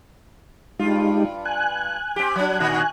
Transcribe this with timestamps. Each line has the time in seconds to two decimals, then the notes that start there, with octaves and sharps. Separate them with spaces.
0.79 G2 G#3 D#4 F4 G4
1.45 G#5 F#6
2.16 C4 G4
2.36 F#3 D4
2.60 A#2 D#3 F#4